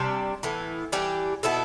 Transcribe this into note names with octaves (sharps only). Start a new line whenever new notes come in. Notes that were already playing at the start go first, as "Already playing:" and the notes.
Already playing: C3 G3 D4
A2 E3 B3
E3 G3 D4 G4
B2 B3 E4 A4